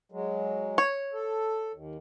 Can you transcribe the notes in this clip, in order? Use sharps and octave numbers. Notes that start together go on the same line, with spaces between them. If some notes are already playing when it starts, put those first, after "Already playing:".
F#3 G#3
C#5
A4
D#2